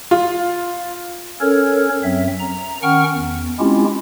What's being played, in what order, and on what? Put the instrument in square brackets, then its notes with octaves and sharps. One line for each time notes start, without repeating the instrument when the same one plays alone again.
[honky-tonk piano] F4
[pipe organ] C#4 A4 A#4 C#5
F#2 F#3 C4 E5
A#5
D#3 C#4 F#5 G5 C#6 F6
E2
G#3 C4 C#4 E4 F4 G4